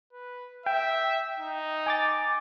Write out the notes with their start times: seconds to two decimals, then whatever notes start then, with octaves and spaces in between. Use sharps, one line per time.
0.13 B4
0.66 E5 G5
1.39 D#4
1.86 G#5 D6 A6